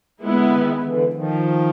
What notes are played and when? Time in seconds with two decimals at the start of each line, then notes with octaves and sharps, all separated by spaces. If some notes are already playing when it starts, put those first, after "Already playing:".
0.23 D3 G#3 B3 E4
0.46 D3
0.53 D#3
0.83 D3 E3
1.13 D#3 F3